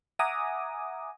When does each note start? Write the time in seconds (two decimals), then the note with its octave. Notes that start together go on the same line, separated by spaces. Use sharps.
0.19 E5 F#5 G#5 A#5 D6 D#6